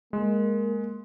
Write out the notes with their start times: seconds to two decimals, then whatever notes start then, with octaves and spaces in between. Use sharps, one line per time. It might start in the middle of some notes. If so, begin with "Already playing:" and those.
0.13 G#3 A#3